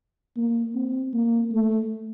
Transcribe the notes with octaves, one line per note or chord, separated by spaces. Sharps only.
A#3
C4
A#3
A3